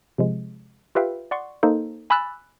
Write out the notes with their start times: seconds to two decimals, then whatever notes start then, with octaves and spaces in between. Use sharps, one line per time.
0.18 C3 F3 G#3
0.95 F4 G4 B4 E5 F5 G5
1.31 D5 F#5 C6 C#6
1.63 A#3 D#4 A4 C5
2.10 G#5 B5 D6 E6 F#6 A6